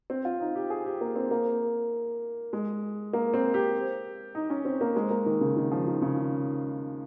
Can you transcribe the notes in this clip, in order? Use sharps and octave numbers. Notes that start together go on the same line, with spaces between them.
C4
F4
D#4
G4
G#4
G4
A#3
C4
A#3
G#3
A#3
C4
G4
D#4
C#4
C4
A#3
G#3
A#3
D#3
C#3
D#3
F3
D#3
C#3